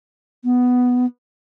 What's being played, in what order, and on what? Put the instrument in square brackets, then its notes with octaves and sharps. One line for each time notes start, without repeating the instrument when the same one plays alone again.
[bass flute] B3